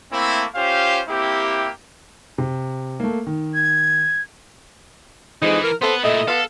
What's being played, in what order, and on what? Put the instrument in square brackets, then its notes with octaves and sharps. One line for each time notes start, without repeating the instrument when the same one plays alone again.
[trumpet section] A3 A#3 C4 E4
C#4 F4 G4 C5 F5
A#3 C4 E4 G4
[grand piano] C3
A3 A#3
D#3
[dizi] G#6
[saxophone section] F2 G#3 D#4 [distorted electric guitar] E3
[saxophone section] A#4
[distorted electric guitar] B3 B4 [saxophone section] A4 C5
[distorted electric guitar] A#2 E4 [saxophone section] A3 D#5
[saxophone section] B3 F5 [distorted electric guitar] A4